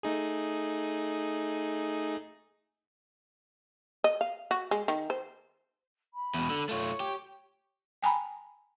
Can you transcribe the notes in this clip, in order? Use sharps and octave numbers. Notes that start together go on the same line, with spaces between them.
A3 D#4 G#4
D#5
F5
F#4
G#3
D#3
C5
B5
E2 B2
D3
A3 F4 C#5
G4
G5 G#5 A#5 B5